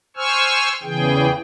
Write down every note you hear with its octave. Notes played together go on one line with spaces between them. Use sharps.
C5 G#5 C#6 E6 F6
E2 C#3 E3 G#4 G5